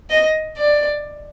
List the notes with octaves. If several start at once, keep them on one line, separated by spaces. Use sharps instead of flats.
D#5
D5